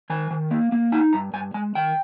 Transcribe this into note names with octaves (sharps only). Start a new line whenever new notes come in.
D#3 G#5
D#3
A#3
A#3
D#4 G#5
G2 A#5
G2 G#5
G#3 G#5
D#3 G5